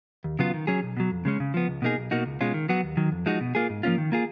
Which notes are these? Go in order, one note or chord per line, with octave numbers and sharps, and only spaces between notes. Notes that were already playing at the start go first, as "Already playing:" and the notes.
D#2
C#3 F#3 B3 F4
D#3
F#3 C#4 G#4
B1
B2 F#3
F2
C#3 G#3 C#4
C#3
F3 B3
C#2
B2 A#3 D#4 G#4
B1
B2 A#3 D#4 F#4
C#2
B2 G#3 C#4 F4
D#3
F#3 B3 F#4
D#2
D#3 F#3
F2
F3 G#3 D#4 F#4
B2
A#3 F4 G#4
G#2
F3 A#3 C#4 F4
D#3
A#3 F4 G#4